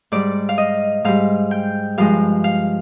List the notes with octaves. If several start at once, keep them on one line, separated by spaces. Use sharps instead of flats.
G#2 G3 D5
F5
D#5
G#2 G3 F5
G5
G2 F3 G#3 F5
F5